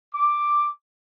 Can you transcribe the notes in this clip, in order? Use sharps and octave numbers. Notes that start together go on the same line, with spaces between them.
D6